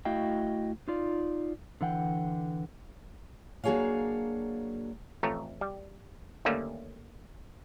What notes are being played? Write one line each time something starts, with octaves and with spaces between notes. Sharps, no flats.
A3 E4 F#4 D#5 F5 G5
D#4 F4 D5
D3 E3 F#5 G5
F#3 A#3 D4 G#4 C#5 F5
A1 F2 A3 C#5 A#5
G3
D#2 D3 G3 A3 A#3 C#4